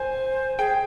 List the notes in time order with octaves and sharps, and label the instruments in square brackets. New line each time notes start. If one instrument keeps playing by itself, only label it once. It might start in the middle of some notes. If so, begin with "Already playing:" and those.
Already playing: [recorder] C5 [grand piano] G#5
[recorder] G#4 [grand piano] G5